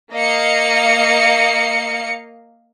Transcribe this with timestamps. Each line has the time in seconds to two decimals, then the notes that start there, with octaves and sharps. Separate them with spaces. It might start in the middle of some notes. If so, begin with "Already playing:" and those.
0.13 A#3 D#5 F5 C#7